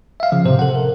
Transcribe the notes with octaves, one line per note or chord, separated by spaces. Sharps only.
E5 F5
C#3 F3
A2 C3 C5
A4 F#5
A#4